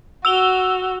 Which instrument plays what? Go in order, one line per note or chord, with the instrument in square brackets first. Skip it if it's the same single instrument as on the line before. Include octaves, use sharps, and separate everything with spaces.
[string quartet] F#4 [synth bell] E6 F7 G7